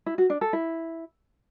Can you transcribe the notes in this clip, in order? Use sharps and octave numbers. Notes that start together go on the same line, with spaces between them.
E4
F#4
D4
A4
E4